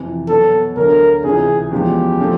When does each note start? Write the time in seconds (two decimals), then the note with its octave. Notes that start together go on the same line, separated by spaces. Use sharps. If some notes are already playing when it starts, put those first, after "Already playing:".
Already playing: F2 C3 E3
0.29 B2 F#3 B3 A4
0.77 D2 D3 F#3 A3 A#4
1.24 C#2 C3 E3 G#4
1.72 E2 C#3 F3 G#3 B3 G4
2.20 C#3 F3 A3 C4